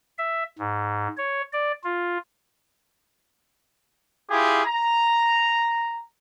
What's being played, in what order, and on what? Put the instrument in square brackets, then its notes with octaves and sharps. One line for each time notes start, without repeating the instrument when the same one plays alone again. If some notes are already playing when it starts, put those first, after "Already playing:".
[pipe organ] E5
G#2
C#5
D5
F4
[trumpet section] E4 F4 G4 G#4
A#5